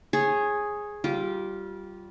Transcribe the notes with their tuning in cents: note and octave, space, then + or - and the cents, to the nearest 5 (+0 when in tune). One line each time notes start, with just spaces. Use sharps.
G#4 +0 C#5 -25
G3 -20 F4 +0